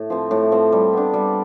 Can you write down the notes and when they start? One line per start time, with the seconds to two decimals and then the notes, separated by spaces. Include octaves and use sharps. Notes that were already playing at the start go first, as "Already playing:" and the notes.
Already playing: A2
0.10 F3 C4
0.31 A2
0.52 F3 C4
0.72 G3
0.93 B3 D4
1.14 G3